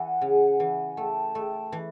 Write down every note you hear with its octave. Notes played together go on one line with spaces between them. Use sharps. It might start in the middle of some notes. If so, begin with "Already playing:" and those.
Already playing: E3 F#5 G#5
C#3
E3
A3 G5 A5
A3
E3